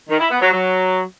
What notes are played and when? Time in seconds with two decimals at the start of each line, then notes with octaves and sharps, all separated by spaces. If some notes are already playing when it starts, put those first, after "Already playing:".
0.09 D#3
0.20 E4
0.31 B3
0.42 F#3
0.52 F#3